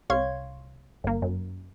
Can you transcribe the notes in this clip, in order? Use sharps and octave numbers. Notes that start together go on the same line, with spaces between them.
C2 C#5 F5 C6 C#6 G#6
G1 A#3
F#2